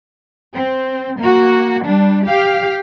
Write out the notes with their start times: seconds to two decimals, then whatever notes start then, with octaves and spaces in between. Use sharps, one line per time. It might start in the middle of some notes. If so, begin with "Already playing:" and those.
0.54 C4
1.20 A#3 F#4
1.84 G3 D4
2.26 G4 F5